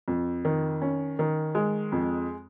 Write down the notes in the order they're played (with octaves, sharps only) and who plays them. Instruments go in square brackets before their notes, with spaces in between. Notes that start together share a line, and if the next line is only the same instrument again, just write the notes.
[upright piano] F2
D#3
C#4
D#3
G#3
F2